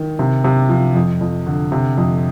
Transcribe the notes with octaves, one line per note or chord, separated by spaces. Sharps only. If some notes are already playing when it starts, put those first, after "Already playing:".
Already playing: D#3
C3
C3
F3
F2
F2
D3
C3
F2